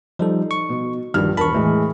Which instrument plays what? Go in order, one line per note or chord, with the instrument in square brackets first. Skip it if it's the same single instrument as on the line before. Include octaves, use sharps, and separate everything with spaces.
[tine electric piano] F3 G3 A4 [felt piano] D#4
[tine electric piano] C#6
[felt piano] B2
[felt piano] A#1 G2 F6 [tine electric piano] D#3
[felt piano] E1 A#4 A5 [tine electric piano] B5 C#6
[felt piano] A2 E3 G#3